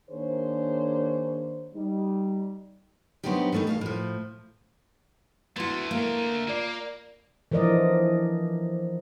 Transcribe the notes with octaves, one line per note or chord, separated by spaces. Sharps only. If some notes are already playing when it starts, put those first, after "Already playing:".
D#3 A#3 D4 G#4 C5 C#5
G3 D#4
F#3 B3 C4 D4 D#4 G4
E3 G3 A3 C#4 D#4
B2 F5 A5
A2 F3
D2 A3 B3 E4 F#4 C6 G#6
A#3 A#4
A#3 F4 D5 C7
E3 F3 A#4 D5 D#5